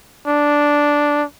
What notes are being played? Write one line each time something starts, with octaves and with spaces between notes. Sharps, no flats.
D4